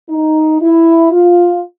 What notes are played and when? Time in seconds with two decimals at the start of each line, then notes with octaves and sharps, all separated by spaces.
0.10 D#4
0.61 E4
1.12 F4